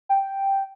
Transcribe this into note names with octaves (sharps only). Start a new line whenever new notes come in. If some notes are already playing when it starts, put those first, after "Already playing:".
G5